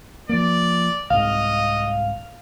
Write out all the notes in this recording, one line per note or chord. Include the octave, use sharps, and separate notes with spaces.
F3 A#3 D5
C2 G#2 D#5 F5